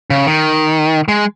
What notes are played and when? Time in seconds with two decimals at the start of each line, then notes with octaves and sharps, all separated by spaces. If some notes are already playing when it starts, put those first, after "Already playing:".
0.10 C#3
0.27 D#3
1.08 G#3